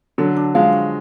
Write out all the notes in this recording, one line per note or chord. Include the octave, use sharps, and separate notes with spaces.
D3 F#3 A4
D4
F3 G#3 F5
F#4